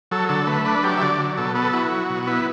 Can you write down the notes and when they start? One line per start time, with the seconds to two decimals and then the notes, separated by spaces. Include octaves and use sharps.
0.11 F#3 A4
0.29 D3 A4
0.47 A3 B4
0.65 D4 B4
0.83 F#3 G4
0.97 E5
1.01 D3 D5
1.20 F#3
1.37 B2 A4
1.55 B3 A4
1.73 E4 F#4
1.92 F#3
2.10 B2
2.23 F#4
2.27 B3 E4